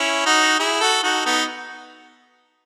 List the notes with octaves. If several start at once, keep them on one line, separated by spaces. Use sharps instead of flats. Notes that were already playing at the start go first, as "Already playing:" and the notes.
Already playing: C#4 E4
D#4 F#4
E4 G#4
F#4 A4
D#4 F#4
B3 D#4